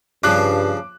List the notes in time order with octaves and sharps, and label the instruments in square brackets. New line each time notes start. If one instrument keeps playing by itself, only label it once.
[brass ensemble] G2 [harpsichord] C#3 F3 D4 [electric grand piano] D6 F#6